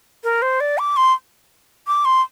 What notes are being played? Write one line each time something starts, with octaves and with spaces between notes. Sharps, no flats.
A#4
C5
D5
D6
C6
D6
C6